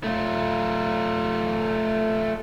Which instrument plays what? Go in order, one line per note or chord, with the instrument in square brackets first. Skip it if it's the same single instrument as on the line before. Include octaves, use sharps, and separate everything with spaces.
[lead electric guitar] A3 F4